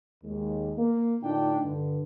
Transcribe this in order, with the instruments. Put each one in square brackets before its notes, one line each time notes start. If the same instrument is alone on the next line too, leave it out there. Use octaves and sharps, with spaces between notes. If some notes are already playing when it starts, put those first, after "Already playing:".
[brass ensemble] D#2 G#3
A#3
A2 D3 D4 D#4 F4 G5
G2 D3